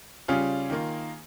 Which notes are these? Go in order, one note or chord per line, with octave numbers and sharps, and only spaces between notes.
C#3 G3 C#4 F4 G#4
D#3 A#3 F4